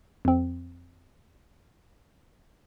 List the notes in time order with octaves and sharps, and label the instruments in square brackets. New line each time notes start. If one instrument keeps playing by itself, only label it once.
[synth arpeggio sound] F2 C4